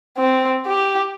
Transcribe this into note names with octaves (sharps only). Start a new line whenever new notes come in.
C4
G4